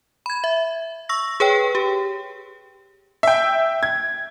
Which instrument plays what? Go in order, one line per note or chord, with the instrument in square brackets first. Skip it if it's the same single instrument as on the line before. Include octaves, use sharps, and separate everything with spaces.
[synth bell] B5 G#6
E5
C#6 E6 A#6
G#4 B4 C#5 G5
G4
[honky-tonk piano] E5 G5
G#6